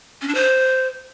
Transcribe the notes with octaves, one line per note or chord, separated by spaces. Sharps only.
C#4
D4
C5